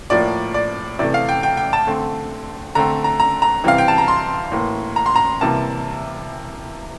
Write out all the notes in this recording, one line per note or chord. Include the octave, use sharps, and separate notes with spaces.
A2 F3 A#3 D5
D5
C3 E3 A3 D5
F5
G5
G5
G5
A5
D3 A3 C4
D3 A3 C4 A#5
A#5
A#5
A#5
C3 E3 G3 C4 F5
G5
A5
A#5
C6
A2 E3 A#3
A#5
C6
A#5
C3 E3 G3 A#3 A5